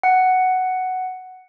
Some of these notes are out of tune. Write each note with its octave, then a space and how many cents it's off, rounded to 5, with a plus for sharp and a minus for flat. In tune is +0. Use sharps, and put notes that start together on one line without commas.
F#5 +5